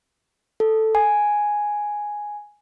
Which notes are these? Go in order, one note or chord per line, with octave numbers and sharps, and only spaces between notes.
A4
G#5